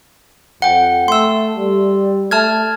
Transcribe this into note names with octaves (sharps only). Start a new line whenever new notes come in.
F2 F#5 G5
A3 C6 E6
G3
A3 A5 F6 G#6